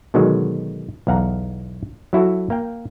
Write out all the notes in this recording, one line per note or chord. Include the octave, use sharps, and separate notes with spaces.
B2 D3 D#3 F#3 G#3
B1 E2 F5 F#5 A#5
F#3 E4 F#4 A4
A#3 F5 G5